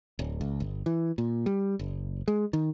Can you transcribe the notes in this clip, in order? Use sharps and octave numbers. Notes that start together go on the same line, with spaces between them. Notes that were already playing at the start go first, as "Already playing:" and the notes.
D1
C#2
G1
E3
A#2
G3
F#1
G#3
D#3